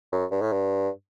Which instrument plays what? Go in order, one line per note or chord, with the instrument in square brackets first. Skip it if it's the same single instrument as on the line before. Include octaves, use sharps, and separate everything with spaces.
[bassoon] F#2
G2
A2
G2